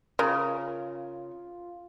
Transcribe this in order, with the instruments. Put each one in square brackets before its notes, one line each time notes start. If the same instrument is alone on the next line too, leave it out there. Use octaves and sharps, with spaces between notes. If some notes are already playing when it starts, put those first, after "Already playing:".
[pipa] C#3 [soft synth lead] F4 [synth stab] A#4